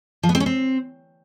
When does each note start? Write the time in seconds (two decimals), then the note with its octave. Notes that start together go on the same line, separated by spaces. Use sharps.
0.23 F3
0.29 B3
0.35 C4
0.40 C#4
0.46 C4